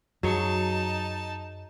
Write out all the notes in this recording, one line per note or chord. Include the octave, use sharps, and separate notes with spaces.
F#2 F#3 D#4 G#4 C#5 A5